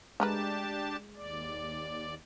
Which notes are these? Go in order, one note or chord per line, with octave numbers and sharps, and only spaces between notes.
G#3 A3 D4 G4 A#4 B4 A5
D#2 D5